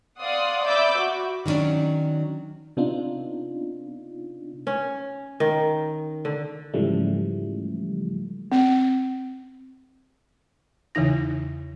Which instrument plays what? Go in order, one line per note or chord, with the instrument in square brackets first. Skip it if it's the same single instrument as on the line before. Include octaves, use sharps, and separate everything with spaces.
[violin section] D5 F5 F#5 C6 D#6
D5 E5 B5 D6 E6 G6
F#4
[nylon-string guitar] D#3 F#3 G3 C#4 D4
[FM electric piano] C3 B3 D4 D#4 F4
[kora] C#4
D#3
D3
[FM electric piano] G#2 C#3 E3 F3 G3 A3
[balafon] C4
[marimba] E2 C#3 E3 D#4 A#6